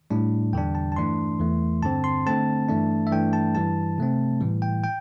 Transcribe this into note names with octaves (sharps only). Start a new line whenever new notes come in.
A2 G3 D4
E2 D3 G3 D4 G5
A5
A5
G2 E3 A3 D4 C6
E2 E3 A3
G2 D3 C4 A5
C6
D3 A3 C4 A5
G2 E3 A3 D4
E5
G2 E3 A3 D4 G5
A5
G2 E3 G3 A5
C3 A3 C4
A2 E3 G3
G5
G5